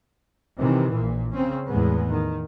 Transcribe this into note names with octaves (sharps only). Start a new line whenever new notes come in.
C3 D#3 E3
A#1 A#2
C#3 C4 C#4
E2 A2 G#3 B3
D#3